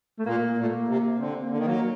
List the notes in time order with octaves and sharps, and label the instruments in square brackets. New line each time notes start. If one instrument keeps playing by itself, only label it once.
[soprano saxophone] A3
[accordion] A#2 [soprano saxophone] A#3
[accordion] A#2
[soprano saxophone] A3
A#3
[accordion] C3
[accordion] D3 [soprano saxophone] C4
[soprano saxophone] A#3
[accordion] D3
D#3
[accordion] F#3 [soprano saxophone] A#3